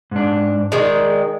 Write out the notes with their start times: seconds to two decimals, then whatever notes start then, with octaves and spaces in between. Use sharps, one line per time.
0.11 G#2 D4
0.72 D#3 G#3 D5